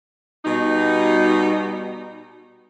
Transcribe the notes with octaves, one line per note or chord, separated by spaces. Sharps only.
B2 G3 D#4